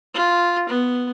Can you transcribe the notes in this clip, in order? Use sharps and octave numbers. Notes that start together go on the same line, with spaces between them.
F4
B3